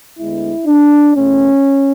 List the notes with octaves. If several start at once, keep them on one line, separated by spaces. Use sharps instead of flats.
D2 D3 G#3 B3 E4
D4
E2 B2 A3 C#4